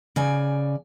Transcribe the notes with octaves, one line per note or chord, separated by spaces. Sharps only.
C#3 D5 G#5